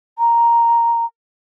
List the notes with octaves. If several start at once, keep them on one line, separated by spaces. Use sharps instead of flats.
A#5